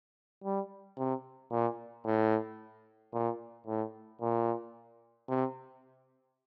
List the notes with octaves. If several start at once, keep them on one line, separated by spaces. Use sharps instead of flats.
G3
C3
A#2
A2
A#2
A2
A#2
C3